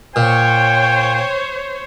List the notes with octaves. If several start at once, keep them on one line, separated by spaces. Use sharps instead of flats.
A#2 C5 C#5 G5